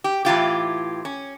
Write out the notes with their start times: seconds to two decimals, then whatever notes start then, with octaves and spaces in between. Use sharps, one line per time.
0.04 G4
0.25 A2 E3 F4 G4
1.05 C#4